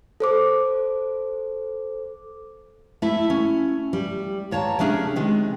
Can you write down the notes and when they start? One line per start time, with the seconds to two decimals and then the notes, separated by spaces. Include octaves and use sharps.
0.20 A4 C5 D6
3.02 A3 E4 A4 E5
3.30 C#4
3.93 G3
4.51 D#2 C#5 A5 A#5
4.79 C3 A3 C#4 D4 G#4 A#4
5.16 C3 D#3 G#3